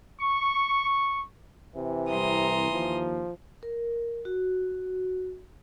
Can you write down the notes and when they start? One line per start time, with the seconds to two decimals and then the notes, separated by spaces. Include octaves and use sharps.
0.21 C#6
1.76 C3 E3
2.10 C2 A#5 C6 D#6
2.71 D#2 F3
3.63 A#4
4.25 F#4